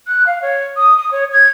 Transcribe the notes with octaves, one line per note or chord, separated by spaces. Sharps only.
F#6
F5
C#5
D#6
D#6
C#5
G#6